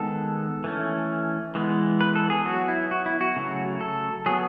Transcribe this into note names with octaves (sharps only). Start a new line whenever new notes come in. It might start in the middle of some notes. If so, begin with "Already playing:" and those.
Already playing: D#3 G#3 B3 A4
E3 A3 C#4
E3 G#3 B3
B4
A4
G#4
F#3 B3 F#4
E4
F#4
E4
F#4
C#3 F#3 A3
A4
F#3 B3 G#4